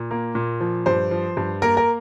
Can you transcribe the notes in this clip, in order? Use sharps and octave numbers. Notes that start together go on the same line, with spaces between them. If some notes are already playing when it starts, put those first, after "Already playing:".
Already playing: A#2
A#3
A#2
F3
G2 C5
F3
G2
A#3 A#4
A#4